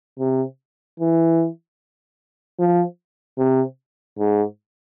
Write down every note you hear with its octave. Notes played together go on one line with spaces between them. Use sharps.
C3
E3
F3
C3
G#2